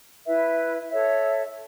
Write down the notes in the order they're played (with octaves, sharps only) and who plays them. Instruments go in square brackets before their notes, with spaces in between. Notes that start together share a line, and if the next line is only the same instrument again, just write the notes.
[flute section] E4 B4 E5
A4 C#5 E5